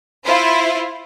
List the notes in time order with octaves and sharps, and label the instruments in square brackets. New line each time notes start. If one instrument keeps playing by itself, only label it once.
[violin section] E4 F4 C5